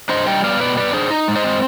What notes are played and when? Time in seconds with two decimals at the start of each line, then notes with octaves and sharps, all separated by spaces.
0.09 D4 C5 D#5
0.27 G3 D#5 G5
0.43 B3 D5 F5
0.60 B2 B4 D5
0.77 B3 B4 D5
0.93 D4 G#4 C5
1.10 D#4
1.28 G#3
1.36 C5 D#5
1.44 C4